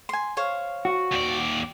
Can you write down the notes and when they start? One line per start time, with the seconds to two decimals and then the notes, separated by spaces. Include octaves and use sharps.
0.09 G#5 C6
0.37 C5 C#5 F5
0.85 F#4
1.12 D#2 D5